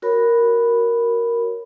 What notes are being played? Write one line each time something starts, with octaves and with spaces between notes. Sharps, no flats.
F#4 A#4 C#5 B5